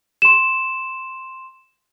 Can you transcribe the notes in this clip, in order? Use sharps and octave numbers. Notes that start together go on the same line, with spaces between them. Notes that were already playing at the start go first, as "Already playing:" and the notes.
C6 E7